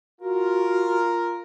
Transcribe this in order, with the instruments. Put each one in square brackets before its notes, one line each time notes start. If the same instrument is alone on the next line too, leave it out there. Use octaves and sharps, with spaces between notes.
[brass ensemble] F4 A#4 [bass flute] F#4